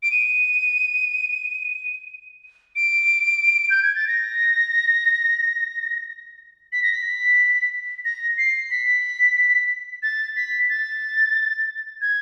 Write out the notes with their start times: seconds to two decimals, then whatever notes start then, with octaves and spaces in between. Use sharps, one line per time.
0.03 D7
0.11 D#7
2.76 D7
3.70 G6
3.83 G#6
3.95 A6
4.08 A#6
6.72 B6
6.83 A#6
6.93 B6
8.05 A#6
8.38 C7
8.71 B6
10.03 A6
10.36 B6
10.69 A6
12.02 G#6